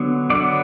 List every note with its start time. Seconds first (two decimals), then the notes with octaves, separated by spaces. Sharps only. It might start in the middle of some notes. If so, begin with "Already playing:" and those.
Already playing: D3 F#3 B3
0.30 D3 F#3 B3 D5